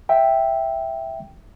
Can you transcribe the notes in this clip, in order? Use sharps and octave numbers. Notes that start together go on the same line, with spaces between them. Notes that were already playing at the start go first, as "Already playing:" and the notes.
E5 G5